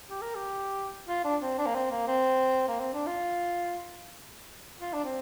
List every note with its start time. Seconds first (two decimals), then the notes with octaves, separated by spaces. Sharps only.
0.10 G4
0.21 A#4
0.35 G4
1.08 F4
1.24 D4
1.42 C4
1.58 D4
1.66 A#3
1.75 C4
1.91 A#3
2.08 C4
2.68 A#3
2.80 C4
2.93 D4
3.06 F4
4.80 F4
4.93 D4
5.04 C4